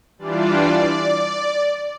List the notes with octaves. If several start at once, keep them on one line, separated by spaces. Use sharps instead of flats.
E3 G3 D4 F4 D5